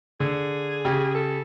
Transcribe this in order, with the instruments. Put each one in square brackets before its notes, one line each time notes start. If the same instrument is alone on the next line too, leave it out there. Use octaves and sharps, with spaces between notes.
[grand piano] D3 [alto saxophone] G#4
[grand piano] C#3 G4
[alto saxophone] A4